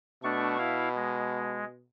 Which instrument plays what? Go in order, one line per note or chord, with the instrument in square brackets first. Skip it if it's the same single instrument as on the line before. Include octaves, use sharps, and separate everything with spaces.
[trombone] B2 [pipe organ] A3 D4 C#6
[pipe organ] E4 F5
G#3